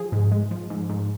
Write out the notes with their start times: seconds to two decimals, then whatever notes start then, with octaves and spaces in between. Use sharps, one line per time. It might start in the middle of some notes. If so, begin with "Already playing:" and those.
Already playing: F3 G#4
0.12 G#2
0.32 G#3
0.51 F3
0.70 G#2
0.90 G#2